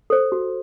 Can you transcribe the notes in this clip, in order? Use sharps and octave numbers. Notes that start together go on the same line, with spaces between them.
A4 C5
F#4